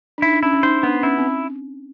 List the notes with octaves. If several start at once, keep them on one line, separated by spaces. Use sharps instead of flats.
D4
D#4 E4
D4
C#4 E4
C#4
D#4 C5
B3 D4
C#4 E4
C4